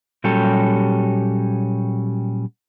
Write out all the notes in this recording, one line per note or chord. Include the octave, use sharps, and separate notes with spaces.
A#2 F#3 G3 C#4 G4 A4